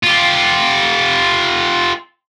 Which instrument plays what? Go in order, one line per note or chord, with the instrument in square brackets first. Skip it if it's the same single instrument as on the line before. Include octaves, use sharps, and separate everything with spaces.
[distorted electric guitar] F4 G4